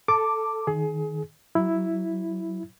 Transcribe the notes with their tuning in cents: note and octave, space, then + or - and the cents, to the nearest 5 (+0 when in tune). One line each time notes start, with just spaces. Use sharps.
A4 +0 A5 +25 D6 +0
D#3 +0 G#4 +25
F#3 +20 E4 +0